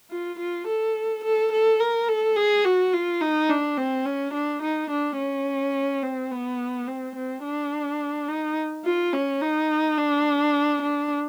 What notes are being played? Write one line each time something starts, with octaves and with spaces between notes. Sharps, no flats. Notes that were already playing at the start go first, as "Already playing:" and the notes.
F4
F4
A4
A4
A4
A#4
A4
G#4
F#4
F4
D#4
D4
C4
C#4
D4
D#4
D4
C#4
C4
B3
C4
C4
D4
D#4
F4
C#4
D#4
D4
D4